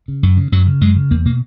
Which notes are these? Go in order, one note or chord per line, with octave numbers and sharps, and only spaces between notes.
C#3
F#2
C#3
F#2 F#3
C#3
F#2 G#3
C#3
E2 A#3
B2 A#3